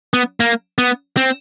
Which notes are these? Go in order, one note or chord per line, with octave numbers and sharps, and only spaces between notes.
B3
A#3
B3
C4